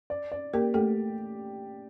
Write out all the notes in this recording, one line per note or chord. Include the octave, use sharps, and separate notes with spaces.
D5
D5
A#3 G4 A#4
A3 G4 A4